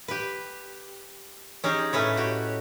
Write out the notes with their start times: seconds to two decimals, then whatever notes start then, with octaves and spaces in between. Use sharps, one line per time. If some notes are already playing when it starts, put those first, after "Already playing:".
0.08 G4 B4
1.64 C#4 D#4 G4 G#4
1.93 A2 A3 C#4 B4 C#5
2.17 F#4 G4